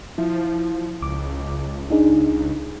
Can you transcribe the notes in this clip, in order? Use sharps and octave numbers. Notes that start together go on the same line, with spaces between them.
F3 E4
C#2 D6
D4 D#4 G#4